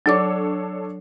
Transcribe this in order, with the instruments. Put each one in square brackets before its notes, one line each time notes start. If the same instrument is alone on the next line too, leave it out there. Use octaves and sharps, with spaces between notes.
[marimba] F#3 D5 D6 [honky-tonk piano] D4 A4 C#5